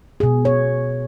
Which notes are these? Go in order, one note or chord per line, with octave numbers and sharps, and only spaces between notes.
B2 G#4
C#5